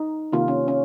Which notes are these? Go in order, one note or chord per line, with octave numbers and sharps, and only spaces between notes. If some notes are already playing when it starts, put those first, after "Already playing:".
Already playing: D#4
C3 D#3 A#3 F4
C#4
C#4